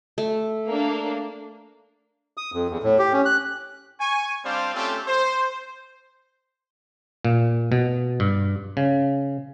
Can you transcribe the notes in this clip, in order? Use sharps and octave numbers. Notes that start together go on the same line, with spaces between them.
A3
A#3 D4
D#6
F2
E2
A2
G4
C#4
F#6
G#5 C#6
G3 C4 D4 C5 D5 F5
A3 C4 C#4 F4 G4 A4
C5
A#2
B2
G2
C#3